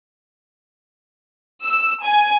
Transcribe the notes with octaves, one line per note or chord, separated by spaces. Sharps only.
E6
G#5